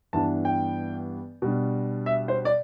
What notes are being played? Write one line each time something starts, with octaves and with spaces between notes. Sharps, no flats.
G2 E3 B3 D4 A5
G5
B2 G3 D4
E5
C5
D5